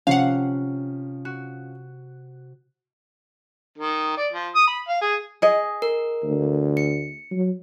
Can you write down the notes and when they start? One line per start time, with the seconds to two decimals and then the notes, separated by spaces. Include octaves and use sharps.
0.07 C3 F3 C#4 F5 F#5
1.25 F#4
3.78 D#3
4.17 D5
4.32 F3
4.55 D#6
4.68 B5
4.88 F5
5.01 G#4
5.42 G#4 D#5
5.82 A#4
6.23 D2
6.77 C#7
7.31 F#3